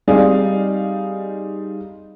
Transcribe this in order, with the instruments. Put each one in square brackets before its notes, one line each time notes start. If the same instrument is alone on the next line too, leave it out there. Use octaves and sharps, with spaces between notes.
[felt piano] G3 C4 D#4 G#4 D5 F5